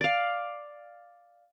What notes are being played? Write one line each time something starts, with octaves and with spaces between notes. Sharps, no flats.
D5 F5